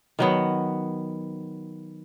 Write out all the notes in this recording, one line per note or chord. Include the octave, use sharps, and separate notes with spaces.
D#3 F#3 B3